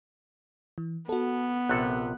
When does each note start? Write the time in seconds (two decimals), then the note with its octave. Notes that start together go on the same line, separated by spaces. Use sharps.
0.78 E3
1.09 B3 F#4 A4
1.69 A#1 C3 A4 F#6